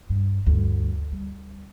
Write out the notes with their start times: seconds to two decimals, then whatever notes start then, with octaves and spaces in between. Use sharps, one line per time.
0.10 G2
0.46 D2 G2
1.12 G3